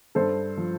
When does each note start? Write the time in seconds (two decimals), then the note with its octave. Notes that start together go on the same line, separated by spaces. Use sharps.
0.15 G2 A4 C5
0.57 F3